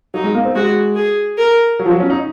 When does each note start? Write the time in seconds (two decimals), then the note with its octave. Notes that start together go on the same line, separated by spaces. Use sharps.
0.14 F#3 D#4
0.24 G#3
0.35 A#3
0.45 C4
0.55 G#3 F#4
0.96 G#4
1.38 A#4
1.79 F#3
1.86 F3
1.90 F#3
2.00 C#4
2.10 D#4